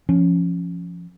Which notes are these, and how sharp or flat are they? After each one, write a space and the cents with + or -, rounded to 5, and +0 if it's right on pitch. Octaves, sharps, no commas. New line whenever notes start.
F3 -10 C#4 +0